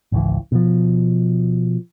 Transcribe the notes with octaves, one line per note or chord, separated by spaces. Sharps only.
G#1 C#2 E3
B2 F3